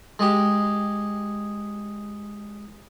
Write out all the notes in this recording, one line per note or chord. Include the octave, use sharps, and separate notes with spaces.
G#3 G4